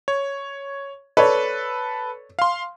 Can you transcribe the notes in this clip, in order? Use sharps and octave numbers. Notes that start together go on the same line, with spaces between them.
C#5
A4 B4 C#5 D5
F5 C6